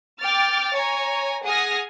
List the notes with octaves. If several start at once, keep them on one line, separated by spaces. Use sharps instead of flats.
G5 D6 F6 A6
C#5 G#5 A#5
G#4 F#5 G#5 D#6 F6 A#6